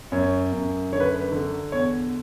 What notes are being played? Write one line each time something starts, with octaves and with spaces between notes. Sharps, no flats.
F#2 C#5
F#2
D3 C#5
B4
B4
D3
E2 C#5